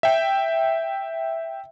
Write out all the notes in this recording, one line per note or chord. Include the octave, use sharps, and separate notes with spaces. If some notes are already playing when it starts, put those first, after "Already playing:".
E5 G5